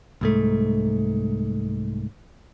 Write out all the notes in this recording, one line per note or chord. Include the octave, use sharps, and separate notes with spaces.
C2 G#2 A3